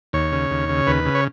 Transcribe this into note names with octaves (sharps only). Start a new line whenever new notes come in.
D#2 C#5
C#3
D#2
C#3
D#2 B4
C#3
C#5